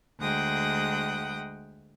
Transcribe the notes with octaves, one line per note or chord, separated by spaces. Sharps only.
D2 G#3 F#5 G5 D#6